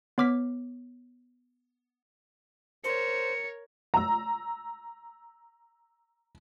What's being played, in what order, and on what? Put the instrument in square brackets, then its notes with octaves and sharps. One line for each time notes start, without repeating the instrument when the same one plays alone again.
[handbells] B3 C#5 D6 F6 B6
[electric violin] A#4 C#5 [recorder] C5 [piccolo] C#7
[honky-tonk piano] A#5 E6